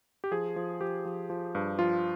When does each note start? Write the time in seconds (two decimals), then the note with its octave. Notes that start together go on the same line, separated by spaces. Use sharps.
0.24 G4
0.31 F3 G#4
0.56 F3
0.81 F3 G4
1.05 F3
1.30 F3
1.55 G2
1.79 F3 F4